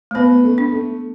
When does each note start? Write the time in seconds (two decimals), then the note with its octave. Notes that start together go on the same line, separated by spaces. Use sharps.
0.11 A3
0.15 B3 B4
0.44 A3
0.58 D4
0.72 A3